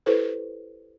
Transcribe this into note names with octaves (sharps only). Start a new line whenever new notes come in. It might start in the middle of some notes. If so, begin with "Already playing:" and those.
E4 G4 A4 B4 C5